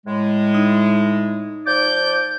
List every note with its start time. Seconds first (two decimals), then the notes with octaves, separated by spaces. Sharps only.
0.05 A2 G#3
0.55 D#4
1.66 F3 D5 D6 G6